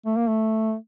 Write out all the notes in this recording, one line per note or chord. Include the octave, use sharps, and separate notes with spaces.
A3
A#3
A3